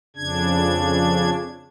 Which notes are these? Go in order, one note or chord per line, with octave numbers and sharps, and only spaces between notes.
F2 C#3 D4 G#6